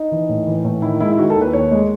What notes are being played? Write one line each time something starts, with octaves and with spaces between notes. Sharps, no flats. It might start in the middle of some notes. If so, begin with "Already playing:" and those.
Already playing: D#4
E3
A2
E3
A2
D#3 E4
G#3 E4
E4
D#3 F#4
A4
D#2
B4
D#2 C#5
G#3